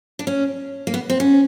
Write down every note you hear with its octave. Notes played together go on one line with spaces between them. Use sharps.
D4
C#4
A#3
B3
C4
C#4